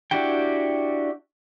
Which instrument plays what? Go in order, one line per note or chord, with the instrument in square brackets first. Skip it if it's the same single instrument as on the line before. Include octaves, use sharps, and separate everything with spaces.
[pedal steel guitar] D4 E4 F#4 G4 G5